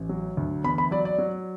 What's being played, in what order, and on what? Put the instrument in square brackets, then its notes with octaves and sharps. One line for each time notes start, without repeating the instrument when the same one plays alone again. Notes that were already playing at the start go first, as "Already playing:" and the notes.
Already playing: [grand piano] A1
F#3
D2
E2 B5
B5
F#3 D5
D5
F#3